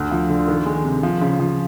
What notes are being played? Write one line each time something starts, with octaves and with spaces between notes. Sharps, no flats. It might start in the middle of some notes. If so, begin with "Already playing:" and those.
Already playing: D2
F3
D3
D#3
G#3
C3
F3
C#3
F3